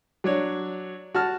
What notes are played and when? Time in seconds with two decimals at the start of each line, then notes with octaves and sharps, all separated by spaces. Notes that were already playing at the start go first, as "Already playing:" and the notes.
0.24 F#3 D4 C#5
1.14 F#4 A5 F6